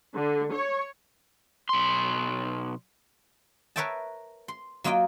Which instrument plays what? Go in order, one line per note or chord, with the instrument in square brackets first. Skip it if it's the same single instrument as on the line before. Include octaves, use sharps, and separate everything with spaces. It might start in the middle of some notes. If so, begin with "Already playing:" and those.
[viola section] D3
C#5
[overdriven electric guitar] B1 C6
[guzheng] A#4 B4 C#5 E5 G5 A5
C6
F#3 A#3 F4 D#5 G5